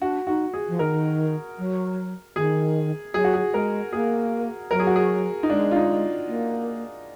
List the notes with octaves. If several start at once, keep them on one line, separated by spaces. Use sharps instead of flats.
D4 F#4
D#4 F#4
G#4
F3
D#3 A#4
F#3
D#3 G#4
F#3 G#4
F#4
G#4
G#3 A#4
A#3 G#4
F#3 A#4
G#4
F#4
G#4
D#4
G#3 D4
F4
D#4
A#3